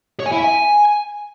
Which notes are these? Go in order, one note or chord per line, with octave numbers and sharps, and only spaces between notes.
C#5
G#5
E4
E5
G#5